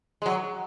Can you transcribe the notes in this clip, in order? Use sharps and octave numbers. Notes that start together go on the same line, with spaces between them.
G#3
F#3